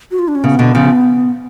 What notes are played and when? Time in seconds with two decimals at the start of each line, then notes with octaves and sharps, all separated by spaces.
0.11 F#4
0.19 F4
0.28 D4
0.35 C#4
0.44 C#3 B3
0.59 B2 D3
0.75 C#3 F3